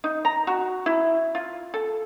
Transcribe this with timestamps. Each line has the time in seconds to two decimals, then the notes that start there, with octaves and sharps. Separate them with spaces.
0.04 D#4
0.25 A#5
0.47 F#4
0.86 E4
1.35 F4
1.74 A4